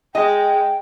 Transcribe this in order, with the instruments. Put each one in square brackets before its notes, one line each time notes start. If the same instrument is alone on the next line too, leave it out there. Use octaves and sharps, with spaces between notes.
[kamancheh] G#3 [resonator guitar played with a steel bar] D#5 [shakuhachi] G5